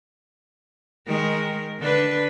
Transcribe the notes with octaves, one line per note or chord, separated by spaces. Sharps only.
D#3 G#3 A#4
D3 D4 B4